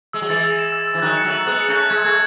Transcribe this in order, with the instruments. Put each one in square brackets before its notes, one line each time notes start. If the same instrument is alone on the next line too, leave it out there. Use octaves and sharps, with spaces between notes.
[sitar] G#3 [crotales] E6
[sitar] F#3
[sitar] E3 G#3 [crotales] A6
[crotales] E6
E7
E6
E6
[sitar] E3
[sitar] D#3 F#3 [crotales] F#6
[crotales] C#7
[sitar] F#3 A3
[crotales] F#7
[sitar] G#3 B3 [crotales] F#6
[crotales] C#7
[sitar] A3 C#4
[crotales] F#6
[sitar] G#3 [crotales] G#6
[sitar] A3 [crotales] G#6